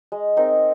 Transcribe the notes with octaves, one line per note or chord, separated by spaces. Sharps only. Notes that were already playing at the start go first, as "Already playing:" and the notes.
G#3
C4 D#4 A#4